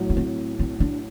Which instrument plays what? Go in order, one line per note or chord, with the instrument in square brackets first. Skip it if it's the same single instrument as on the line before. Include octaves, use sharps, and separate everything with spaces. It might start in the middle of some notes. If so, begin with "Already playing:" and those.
Already playing: [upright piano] B1 A2 F#3
[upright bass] D4
C4
C4
D4